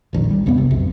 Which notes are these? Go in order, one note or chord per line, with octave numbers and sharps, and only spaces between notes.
E1 A#1 D#3
G3
E1 C2 G2 B3
C3
B1 F2